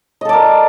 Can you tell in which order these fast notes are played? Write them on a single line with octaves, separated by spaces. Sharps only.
D#5 A4 D5 A#4